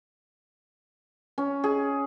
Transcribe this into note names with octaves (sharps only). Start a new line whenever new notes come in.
C#4
G#4